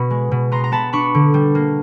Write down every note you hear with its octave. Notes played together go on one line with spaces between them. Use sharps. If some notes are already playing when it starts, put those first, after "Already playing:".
Already playing: B2 B3 B5 C#6
G#3
B2
B3 A#5 C6
A#5
B3 A5 B5
D4 B5 C#6
D3
G3
A#3